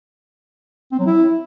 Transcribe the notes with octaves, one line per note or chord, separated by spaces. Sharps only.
C4
F#3
E4